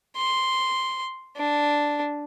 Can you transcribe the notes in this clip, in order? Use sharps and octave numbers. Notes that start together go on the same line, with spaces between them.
C6
D4